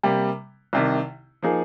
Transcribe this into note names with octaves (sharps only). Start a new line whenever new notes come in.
C3 G3 A#3
C2 C3 D#3
F3 A#3 D#4 G#4